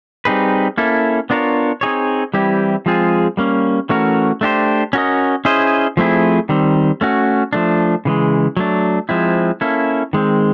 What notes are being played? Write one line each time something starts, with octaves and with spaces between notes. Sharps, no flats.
G3 C4 D#4 G#4 B4
A#3 C#4 E4 A4
B3 D4 F4 A#4 C#5
C4 D#4 G#4 C#5
E3 G3 C4 E4 G4
F3 G#3 C4 F4 G#4
G3 A#3 C#4
E3 A3 C#4 F#4 A#4
A3 D4 G4 C5
C#4 F#4 A#4 D#5
C#4 E4 G#4 C5 D#5
F3 A3 C4 E4 G#4
D#3 G3 C4
A3 C#4 F#4
F3 A3 D4
C#3 E3 G#3
F#3 A3 D4
F3 G#3 C4 E4
A#3 C#4 E4 A4
D#3 G#3 C4